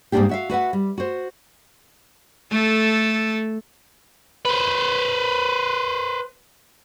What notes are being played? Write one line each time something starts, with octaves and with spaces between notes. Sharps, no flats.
G#2 G3 A#3 D4 F4 G4
F#4 E5 F5
F#4 B4 E5 F#5
G3
F#4 C5
A3 A4
B4 C5